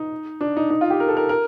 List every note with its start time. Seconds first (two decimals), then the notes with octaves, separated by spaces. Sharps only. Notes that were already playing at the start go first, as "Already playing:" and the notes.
Already playing: D#4
0.41 D4
0.57 D#4
0.70 D#4
0.81 F4
0.90 G4
1.00 A#4
1.08 A4
1.17 A#4
1.29 A#4